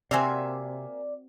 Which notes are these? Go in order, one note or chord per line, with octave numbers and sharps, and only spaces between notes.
C3 A#3 C4 F#4 D5 E5 F5 G#5